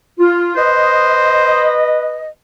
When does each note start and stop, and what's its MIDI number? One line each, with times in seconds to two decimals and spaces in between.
0.19 0.54 65
0.56 2.29 71
0.56 1.76 72
0.56 2.29 75